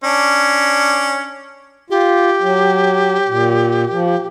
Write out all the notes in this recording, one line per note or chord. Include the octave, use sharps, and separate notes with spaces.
C#4 D4
F4 G4
F#3
A#2
F3